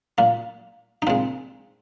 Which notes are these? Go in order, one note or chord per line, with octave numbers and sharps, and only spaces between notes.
A#2 A#3
D#4
A#2 G#3 C4